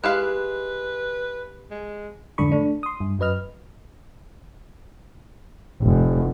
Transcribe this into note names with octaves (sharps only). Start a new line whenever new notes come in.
G#3 E4 G4 B4 F5 F#6
G#3
F2 G#2 D3 D4 B5 C#6
A3 D4
C6 D#6
G2
F#2 F#3 B4 D#5 F6
F1